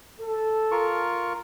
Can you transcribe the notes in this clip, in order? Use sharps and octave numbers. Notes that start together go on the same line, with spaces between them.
A4
F4 A#4 C#6